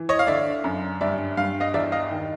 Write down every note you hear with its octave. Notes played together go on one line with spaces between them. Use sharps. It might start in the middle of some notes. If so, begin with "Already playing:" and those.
Already playing: E3
C#5 D#5
F5
D3 D5 E5
F#2
G2 D5 E5
G2 F5
D#5 F5
E2 D5 E5
D#5 F5
D#3